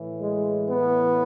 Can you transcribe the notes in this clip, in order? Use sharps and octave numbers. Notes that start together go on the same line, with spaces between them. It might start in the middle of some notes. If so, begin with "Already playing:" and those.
Already playing: A2 E3
G#3
B3